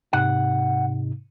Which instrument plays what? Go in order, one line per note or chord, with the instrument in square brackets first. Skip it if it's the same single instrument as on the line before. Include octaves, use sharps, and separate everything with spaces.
[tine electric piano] G#2 C3 D#4 [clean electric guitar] F#5